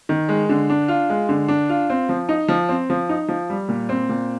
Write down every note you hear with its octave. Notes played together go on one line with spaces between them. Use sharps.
D#3
G#3
D3
D4
F4
G#3
D3
D4
F4
C4
F3
D#4
F3
C4
F3
D#4
F3
G3
A#2
C4
A#2